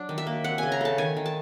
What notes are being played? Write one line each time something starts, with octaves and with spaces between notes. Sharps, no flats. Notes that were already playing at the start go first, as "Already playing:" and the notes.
Already playing: F#3 D4
D#3
E5
A#3
C4 F#5
C#3 G#5
A#5
A3 A5
D#3 G#5
D#3
A5